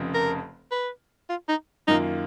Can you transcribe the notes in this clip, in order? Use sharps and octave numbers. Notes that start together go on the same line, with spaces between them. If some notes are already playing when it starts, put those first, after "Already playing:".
Already playing: F1 F2 C#3
A#4
B4
F4
D#4
F#2 D#3 A#3 D#4 F4